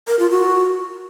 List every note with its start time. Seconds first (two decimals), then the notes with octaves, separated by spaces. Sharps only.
0.08 A#4
0.19 F4
0.31 F#4